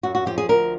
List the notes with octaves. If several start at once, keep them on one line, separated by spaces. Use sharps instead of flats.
F#2 F#4
F#4
F3 G4
G#4
D2 A#4